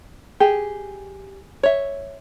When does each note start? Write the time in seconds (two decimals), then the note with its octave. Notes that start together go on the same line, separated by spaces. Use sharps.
0.40 G4 G#4
1.63 C#5 E5